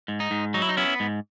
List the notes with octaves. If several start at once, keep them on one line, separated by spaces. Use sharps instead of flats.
G#2
D#4
G#2
F#3 D#4
E4
D#4
B3 C#4 E4
G#2